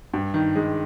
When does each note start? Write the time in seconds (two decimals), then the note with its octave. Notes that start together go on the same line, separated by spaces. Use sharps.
0.13 G2
0.34 D#3
0.56 G#3